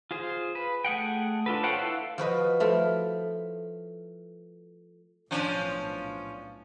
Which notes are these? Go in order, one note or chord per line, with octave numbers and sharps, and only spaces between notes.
F4 G#4 C5
B4
A3 G#4 F#5 G5
D4 F4 A4 B4
A4 C5 C#5 F#5 G5
E4 A4 B4 E5 F5
F3 F#4 B4 D#5
F3 A3 E4
B1 A2 F3 C#4 D4